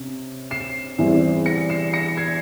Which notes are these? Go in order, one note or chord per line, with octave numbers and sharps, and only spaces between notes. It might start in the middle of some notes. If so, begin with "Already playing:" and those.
Already playing: C3 C#4
C7 E7
E2 E3 G3 C4 E4
A#6 C#7
C7 E7
A#6 C#7
G#6 C7